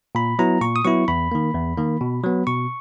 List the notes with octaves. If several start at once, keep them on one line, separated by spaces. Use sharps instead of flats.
A#2 B5
F#3 B3 E4 A#5
A#2 C#6
D#6
F#3 B3 E4 C#6
E2 B5
D#3 A#3
E2
D#3 A#3
B2
F#3 B3
B2 C#6